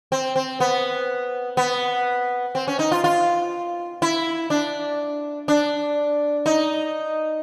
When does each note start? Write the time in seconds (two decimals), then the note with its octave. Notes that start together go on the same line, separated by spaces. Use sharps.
0.12 C4
0.36 C4
0.60 B3
1.57 B3
2.55 C4
2.68 C#4
2.79 D#4
2.92 F4
3.04 F4
4.02 E4
4.50 D4
5.48 D4
6.46 D#4